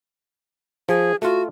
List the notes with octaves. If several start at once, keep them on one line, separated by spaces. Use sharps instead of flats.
F3 G#4
A3 F4 F#4